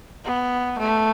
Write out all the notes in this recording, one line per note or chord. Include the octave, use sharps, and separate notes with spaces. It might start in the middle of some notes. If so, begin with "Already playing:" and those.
B3
A3